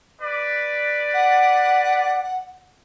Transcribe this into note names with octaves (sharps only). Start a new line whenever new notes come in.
B4 D5
F#5